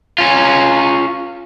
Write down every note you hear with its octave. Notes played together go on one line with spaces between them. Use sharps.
C#4 F4